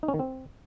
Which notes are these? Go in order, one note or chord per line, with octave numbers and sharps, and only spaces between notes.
D#4
C#4
D#3
C4